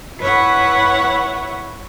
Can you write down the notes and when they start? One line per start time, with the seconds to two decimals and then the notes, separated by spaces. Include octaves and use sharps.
0.19 E4 B4 C#5 E5 F#5